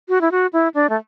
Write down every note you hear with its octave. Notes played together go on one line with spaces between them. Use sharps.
F#4
E4
F#4
E4
D4
A3